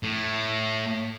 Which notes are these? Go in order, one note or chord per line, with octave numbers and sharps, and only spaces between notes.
A2